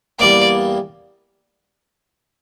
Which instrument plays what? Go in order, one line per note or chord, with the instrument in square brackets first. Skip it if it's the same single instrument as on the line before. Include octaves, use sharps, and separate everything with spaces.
[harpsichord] E2 E3 G3 A#3 [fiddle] D5